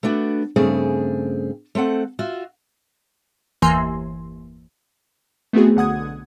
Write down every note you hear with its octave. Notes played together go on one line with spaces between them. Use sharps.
A3 B3 D4 F#4
G2 C#3 A3 C4 G#4
A3 C4 A4 F#5
F4 F#4 E5
G1 E2 E3 A#3 G#5 C6
A3 B3 C4 F#4 G#4
B1 D3 F#5 D#6 G#6